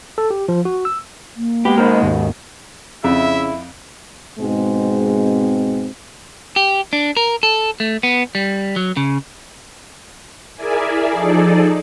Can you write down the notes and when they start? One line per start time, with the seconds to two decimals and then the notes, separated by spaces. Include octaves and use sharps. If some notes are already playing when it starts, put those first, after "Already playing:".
0.18 A4
0.31 G4
0.49 F3
0.65 F#4
0.85 E6
1.36 A#3
1.65 G#3 B3 G4 B5
1.78 B2 D#3 A#4 C5 B5
2.02 D#2 G#2
3.04 F2 C#3 E4 E5
4.39 G#2 B2 G#3 C4
6.56 G4
6.93 D4
7.17 A#4
7.43 A4
7.80 A3
8.03 B3
8.35 G3
8.76 F#3
8.97 C#3
10.56 E4 G#4 A#4 D5 E5 G#5
11.13 F3 D#4 G#4 A4 D5